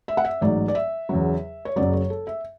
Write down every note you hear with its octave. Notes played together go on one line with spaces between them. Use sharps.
E5
F#5
E5
A1 G#2 F#3 D5
D5
E5
E2 C#3 F#3
C#5
F#1 F#2 C#3 F#3 D5
C#5
A4
E5